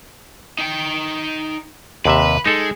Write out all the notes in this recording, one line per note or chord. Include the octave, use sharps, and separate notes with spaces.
D#4 G5
D#2 C3 B4 E5
G#3 D#4 A4